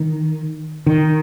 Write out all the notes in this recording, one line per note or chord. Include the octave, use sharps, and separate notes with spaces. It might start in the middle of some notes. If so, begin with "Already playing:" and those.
Already playing: D#3
D#3